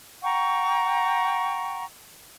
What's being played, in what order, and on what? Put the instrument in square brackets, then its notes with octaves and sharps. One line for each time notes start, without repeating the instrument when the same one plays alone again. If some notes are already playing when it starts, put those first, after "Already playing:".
[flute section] F#5 G5 A#5 C#6